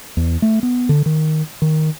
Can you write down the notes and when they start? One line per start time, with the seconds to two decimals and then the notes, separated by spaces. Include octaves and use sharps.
0.17 E2
0.42 A3
0.63 B3
0.89 D3
1.06 D#3
1.62 D#3